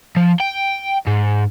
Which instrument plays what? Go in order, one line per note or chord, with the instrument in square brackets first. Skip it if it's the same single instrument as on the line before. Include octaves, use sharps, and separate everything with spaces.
[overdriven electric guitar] F3
G5
G#2